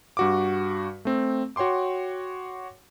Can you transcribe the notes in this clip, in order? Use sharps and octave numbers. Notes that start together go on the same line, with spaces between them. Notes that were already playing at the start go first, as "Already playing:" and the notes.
G2 F#4 D6
A3 C4
F#4 C#5 G5 C6 D6